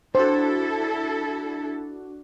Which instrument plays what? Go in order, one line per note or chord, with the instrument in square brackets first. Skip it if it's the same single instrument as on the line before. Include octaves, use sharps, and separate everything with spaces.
[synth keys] D4 F#4 [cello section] E4 A4 [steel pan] C5